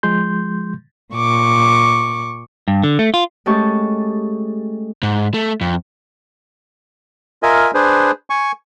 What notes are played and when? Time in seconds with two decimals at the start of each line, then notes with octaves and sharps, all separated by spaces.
0.03 F3 G#3 C6 G6
1.14 A#2 C#6 D6
2.68 G2
2.83 D3
2.99 A3
3.14 F4
3.46 G#3 A3 C#4 G4 A5 C#6
5.03 G#2
5.34 A3
5.61 F2
7.43 F4 A#4 D#5 E5 G#5
7.74 D4 G#4 B4 C5
8.30 G#5 C#6